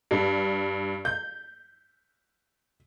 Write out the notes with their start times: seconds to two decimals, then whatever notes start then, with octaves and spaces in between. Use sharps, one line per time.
0.11 G2
1.05 G6